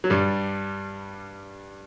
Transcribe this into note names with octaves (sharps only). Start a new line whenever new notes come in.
F#3
G2 G3